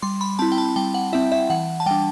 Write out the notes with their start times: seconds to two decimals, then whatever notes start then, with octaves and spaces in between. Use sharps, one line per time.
0.02 G3 C6
0.21 B5
0.39 C4 E4 A5
0.52 G5
0.58 A5
0.76 G3 G5
0.94 F#5
1.13 C4 E4 E5
1.32 E5
1.50 E3 F#5
1.80 A5
1.86 G3 D4 G5